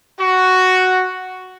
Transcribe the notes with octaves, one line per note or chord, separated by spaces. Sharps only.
F#4